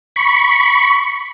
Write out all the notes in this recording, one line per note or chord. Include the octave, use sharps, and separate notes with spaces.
B5 C#6